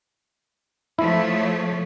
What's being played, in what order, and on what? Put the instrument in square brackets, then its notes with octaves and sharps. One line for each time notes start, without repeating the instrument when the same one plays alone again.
[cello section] F3 A3 C#5 [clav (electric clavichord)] E4